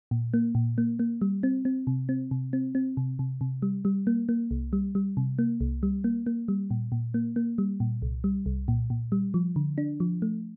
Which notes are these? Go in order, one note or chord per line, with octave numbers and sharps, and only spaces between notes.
A#2
A#3
A#2
A#3
A#3
G3
C4
C4
C3
C4
C3
C4
C4
C3
C3
C3
G3
G3
A#3
A#3
C2
G3
G3
C3
A#3
C2
G3
A#3
A#3
G3
A#2
A#2
A#3
A#3
G3
A#2
C2
G3
C2
A#2
A#2
G3
F3
D3
D4
F3
A3